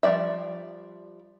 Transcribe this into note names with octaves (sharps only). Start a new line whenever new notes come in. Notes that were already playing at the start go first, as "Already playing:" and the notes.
F3 G3 A3 D5 E5